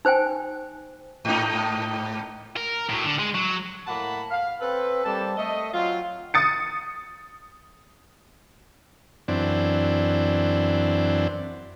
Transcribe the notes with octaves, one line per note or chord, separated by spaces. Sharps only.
D#4 C5 G5 G#5
G#2 D#4
A#4
A2 F#3
D3
G#3
F#3
A2 A#3 F#5 A5 B5
F5
C4 A4 B4
G3 A#3 C4 A4 A5
A3 D#5
F#3 C4 F4
D#6 A6 C#7
F#2 E3 C4 D4